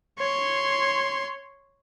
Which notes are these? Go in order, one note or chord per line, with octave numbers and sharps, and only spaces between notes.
C#5 C6